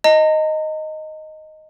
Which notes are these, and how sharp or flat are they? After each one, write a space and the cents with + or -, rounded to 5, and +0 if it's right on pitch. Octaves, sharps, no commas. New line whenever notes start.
D#5 +0 A#5 -45